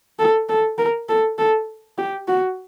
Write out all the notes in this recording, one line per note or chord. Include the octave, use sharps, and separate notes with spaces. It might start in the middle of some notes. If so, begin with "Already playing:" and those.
A4
A4
A#4
A4
A4
G4
F#4